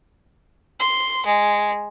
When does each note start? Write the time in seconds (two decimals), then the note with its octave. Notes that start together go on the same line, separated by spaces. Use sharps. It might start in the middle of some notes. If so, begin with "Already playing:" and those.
0.79 C6
1.27 G#3